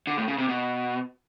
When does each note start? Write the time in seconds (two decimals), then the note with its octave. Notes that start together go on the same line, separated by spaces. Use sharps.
0.07 D3
0.18 A2
0.28 C#3
0.38 C3
0.49 B2